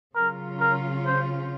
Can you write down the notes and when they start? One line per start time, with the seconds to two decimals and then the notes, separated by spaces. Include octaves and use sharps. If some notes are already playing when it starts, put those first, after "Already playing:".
0.15 C#3 F#3 C#4 F4 A#4
0.60 A#4
1.06 C5